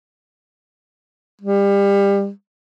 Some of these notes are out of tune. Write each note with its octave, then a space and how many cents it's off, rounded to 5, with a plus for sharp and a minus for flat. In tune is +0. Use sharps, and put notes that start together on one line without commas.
G3 +25